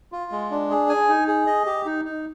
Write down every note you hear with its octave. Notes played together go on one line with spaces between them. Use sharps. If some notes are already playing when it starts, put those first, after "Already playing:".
F4
G#3
D4
G#4
G#5
D#4
G#4
D#5
G4
D#4
D#4